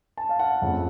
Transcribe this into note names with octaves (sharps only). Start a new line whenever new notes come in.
A5
F5
F#5
F2 C#3 A3